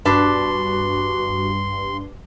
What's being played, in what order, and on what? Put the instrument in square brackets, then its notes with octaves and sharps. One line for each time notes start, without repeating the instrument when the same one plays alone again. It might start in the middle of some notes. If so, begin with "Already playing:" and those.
[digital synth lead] G2 [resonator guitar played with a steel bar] B2 D4 B4 [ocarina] F#4 [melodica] C6